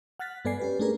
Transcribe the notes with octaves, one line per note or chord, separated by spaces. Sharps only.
F#5 F6 F#6 A6 B6
G2 B3 A4 D5 G#5 C7
C#4 G4 B4
A3 C#4 D4 G#4 A#4 B4